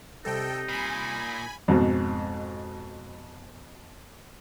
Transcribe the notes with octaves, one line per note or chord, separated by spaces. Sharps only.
C3 G3 D#4 A4 D#5 G5
A#2 G#5 B5
F2 G#2 B2